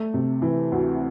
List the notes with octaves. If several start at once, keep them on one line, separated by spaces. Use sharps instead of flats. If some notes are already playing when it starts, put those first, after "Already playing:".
Already playing: A3
C3
E3
D2